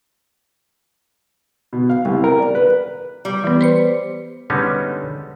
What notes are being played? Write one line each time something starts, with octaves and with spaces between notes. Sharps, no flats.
B2
F5
C2
A#4
D5
B4
G3
E3 B3
B4 C5 C#7
D3 G3 G#3 B3 C#4 D#4